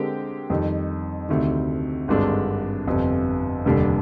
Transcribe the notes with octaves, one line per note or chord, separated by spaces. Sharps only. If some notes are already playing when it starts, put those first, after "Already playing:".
Already playing: D3 G#3 C4 G4 A#4
F2 D#3 G3
D2 C3 D#3
G#1 G2 D3 G#3 D4
G1 F2 C3
F1 D#2 D3 G3 D4